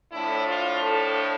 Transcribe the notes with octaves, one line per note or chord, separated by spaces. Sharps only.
A2 F3 A3 D4 E4
F4
A4